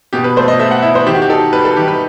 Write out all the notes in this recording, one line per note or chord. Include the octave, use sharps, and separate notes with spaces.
B2 G4
B4
A3 C5
D#5
A3 E5
F#5
E4 E5
C5
D#3 G4
F#4
G4
D#4 A4
G3 B4
A4
D#3 G4
B4